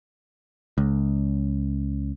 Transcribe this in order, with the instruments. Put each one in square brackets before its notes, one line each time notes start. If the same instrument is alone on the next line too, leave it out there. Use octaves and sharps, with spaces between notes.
[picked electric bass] C#2